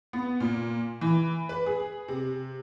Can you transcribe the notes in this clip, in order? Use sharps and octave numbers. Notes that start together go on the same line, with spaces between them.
B3
A#2
E3
B4
G#4
C3